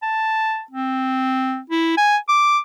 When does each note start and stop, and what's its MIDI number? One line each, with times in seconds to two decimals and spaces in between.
0.03 0.62 81
0.71 1.60 60
1.70 1.96 64
1.98 2.17 80
2.29 2.59 86